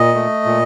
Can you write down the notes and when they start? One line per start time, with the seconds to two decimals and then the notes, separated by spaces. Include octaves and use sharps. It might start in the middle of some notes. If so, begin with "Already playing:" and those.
Already playing: A#2 D#5
0.15 A3
0.46 A#2